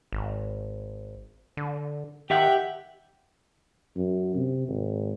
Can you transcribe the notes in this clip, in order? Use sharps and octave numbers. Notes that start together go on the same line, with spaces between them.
G#1
D3
D#3 G4 E5 F#5 G5
F#2
C3
G#1